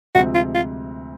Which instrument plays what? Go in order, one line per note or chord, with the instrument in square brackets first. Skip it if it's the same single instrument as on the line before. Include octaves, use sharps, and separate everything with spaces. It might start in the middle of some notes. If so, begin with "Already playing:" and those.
[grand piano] D2 C3 F3 G#3 C4 [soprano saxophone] F#4
[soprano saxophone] F4
F4